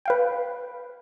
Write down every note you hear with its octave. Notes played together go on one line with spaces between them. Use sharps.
B4 F5 G5